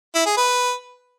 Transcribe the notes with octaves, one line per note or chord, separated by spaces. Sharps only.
E4
G#4
B4